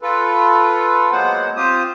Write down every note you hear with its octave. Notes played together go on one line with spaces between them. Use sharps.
F4 A4 B4
F#3 G#3 A#3 B3 C5 F#5
C4 F4 G4 C5 D#6